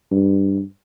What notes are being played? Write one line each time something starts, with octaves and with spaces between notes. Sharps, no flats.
G2